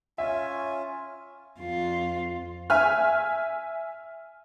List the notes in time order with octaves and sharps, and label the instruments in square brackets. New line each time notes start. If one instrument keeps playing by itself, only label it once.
[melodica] C#4 F4 [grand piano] E5 [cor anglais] G#5
[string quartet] F2 F4
[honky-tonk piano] E5 G#5 F6